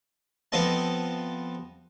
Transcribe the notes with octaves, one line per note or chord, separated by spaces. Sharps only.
F3 B3 C4 A4 D#5 A5